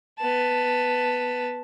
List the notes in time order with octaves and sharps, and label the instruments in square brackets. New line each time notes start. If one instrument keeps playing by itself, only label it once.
[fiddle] B3 A5